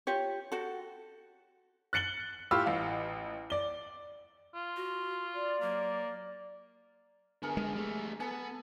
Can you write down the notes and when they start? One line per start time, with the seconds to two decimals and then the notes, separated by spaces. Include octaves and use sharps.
0.07 F4 G4 C#5
0.52 F#4 A4
1.93 F#6 A6 C#7 F#7 G7
2.51 A2 F4 G4 B5 E6
2.66 A1 F5
3.50 D5 G7
4.55 F4
4.76 F#4
5.34 D5
5.62 F#3 A#3
7.43 D3 B3 G#4 A#4
7.57 G#3
7.75 G3 A3
8.20 B3 A4 G#5